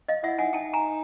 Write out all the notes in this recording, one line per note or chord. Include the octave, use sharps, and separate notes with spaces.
D#5 F5
E4 E5 F#5
D#4 F#5 G#5
D#4 G5 A5
G#5 A#5